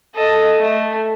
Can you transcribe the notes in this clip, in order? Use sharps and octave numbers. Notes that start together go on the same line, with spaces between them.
A4 D#5
A3